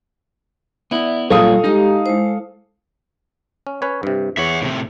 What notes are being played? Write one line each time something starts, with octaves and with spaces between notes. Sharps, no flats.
B3 E4 D5 E5
A#2 F#3 G3 F4 A4 C#5 F5 D#6
G#3 D#4 G4 A#5
G#3 E4 C5
C#4
C#4 B4 C#5
G2 C3
E2 C#5 E5 F#5
A2 C3